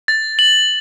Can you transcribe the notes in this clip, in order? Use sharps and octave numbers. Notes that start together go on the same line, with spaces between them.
A6
F#7